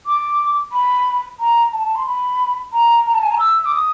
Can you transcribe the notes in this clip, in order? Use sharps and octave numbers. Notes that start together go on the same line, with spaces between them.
D6
B5
A#5
A5
A5
C6
B5
A#5
A#5
A5
G#5
A#5
E6
D6
D#6